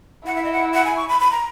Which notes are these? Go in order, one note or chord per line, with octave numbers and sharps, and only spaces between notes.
E4 F#5
E5
D#5
F#5
F#5
G#5
C#6
B5
B5
A#5